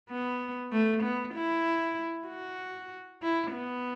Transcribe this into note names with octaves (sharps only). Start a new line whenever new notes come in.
B3
A3
B3
E4
F#4
E4
B3